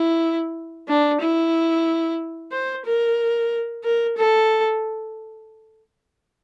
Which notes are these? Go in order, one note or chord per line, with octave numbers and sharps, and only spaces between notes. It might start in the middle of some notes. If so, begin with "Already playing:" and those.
Already playing: E4
D4
E4
C5
A#4
A#4
A4